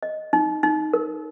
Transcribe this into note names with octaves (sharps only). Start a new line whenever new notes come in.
D#5
D#4
D#4
A#4